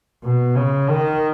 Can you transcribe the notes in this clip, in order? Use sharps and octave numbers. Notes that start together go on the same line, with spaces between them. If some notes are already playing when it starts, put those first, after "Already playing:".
B2
C#3
D#3